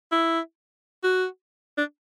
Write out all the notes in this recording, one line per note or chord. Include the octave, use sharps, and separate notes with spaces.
E4
F#4
D4